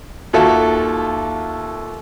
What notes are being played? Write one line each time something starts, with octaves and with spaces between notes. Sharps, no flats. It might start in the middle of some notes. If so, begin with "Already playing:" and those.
D#2 F4 F#4 A4 E5